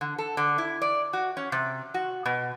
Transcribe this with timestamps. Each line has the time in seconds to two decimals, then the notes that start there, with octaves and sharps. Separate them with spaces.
0.01 D3
0.18 A4
0.37 D3
0.58 E4
0.82 D5
1.13 F#4
1.37 C#4
1.52 C3
1.94 F#4
2.26 B2